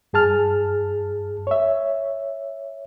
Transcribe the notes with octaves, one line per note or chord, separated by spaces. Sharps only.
G2 G#4 A5 F6
C#5 E5